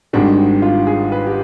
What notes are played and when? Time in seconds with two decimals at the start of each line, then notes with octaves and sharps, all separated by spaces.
0.13 G#1 G#2 D#3 G3 D4
0.62 F4
0.87 G#4
1.12 B4
1.27 G4